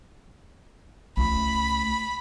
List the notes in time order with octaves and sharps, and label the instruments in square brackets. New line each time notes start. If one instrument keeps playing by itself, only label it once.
[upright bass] C#2 A3 [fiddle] B5